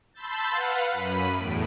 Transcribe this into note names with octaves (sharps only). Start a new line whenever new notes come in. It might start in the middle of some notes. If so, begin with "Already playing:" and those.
A5 B5 C6 E6 G6 A6
B4 F5 F#5
F#2 B5 D#7
E2 A2 D7